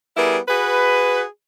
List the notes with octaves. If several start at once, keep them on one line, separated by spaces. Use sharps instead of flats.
G3 B3 E4 G#4 A#4
F#4 G#4 B4